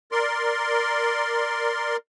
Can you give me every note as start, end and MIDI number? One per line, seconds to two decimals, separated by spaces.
0.12 1.97 70
0.12 1.97 74
0.12 1.97 84